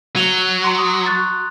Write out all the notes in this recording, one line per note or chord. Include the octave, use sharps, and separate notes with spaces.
F#3 D#7 F7 G7
A#5 C6
D#6
C#6 F#6 A6